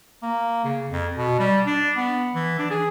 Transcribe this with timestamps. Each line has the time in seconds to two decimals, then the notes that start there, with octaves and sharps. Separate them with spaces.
0.22 A#3
0.65 C#3
0.90 F2
1.16 B2
1.39 G3
1.66 D4
1.96 B3
2.35 E3
2.59 D4
2.71 G#4